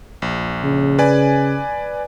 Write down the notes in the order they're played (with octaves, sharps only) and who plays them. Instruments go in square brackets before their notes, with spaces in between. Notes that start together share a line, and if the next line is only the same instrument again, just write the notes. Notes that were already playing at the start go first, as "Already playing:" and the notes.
[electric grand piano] A#1
[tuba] C#3
[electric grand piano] B4 D5 G#5